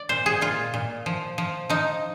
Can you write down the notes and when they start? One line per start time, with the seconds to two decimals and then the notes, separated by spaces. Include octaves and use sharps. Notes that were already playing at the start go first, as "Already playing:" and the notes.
Already playing: D5
0.09 A#2 C5
0.26 G#4
0.41 A#2 F4
0.74 A#2
1.06 F3
1.38 F3
1.69 F3 D#4